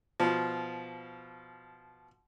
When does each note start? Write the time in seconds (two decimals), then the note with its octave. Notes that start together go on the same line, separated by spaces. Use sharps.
0.20 B2 F3